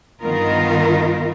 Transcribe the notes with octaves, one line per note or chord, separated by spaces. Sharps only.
G2 D#3 B3 D#4 F4 A#4